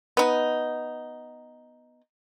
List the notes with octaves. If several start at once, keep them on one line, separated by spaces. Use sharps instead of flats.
B3 D#4